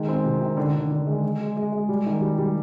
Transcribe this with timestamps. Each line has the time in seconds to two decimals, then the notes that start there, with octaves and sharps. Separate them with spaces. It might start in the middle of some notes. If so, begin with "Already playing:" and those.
Already playing: D#3 G#3
0.09 C4
0.25 C3
0.42 D#3
0.57 D3
0.74 D3
0.91 D3
1.07 G#3
1.23 G#3
1.40 G#3
1.57 G#3
1.72 G#3
1.89 G3
2.06 D#3
2.22 G3
2.39 G3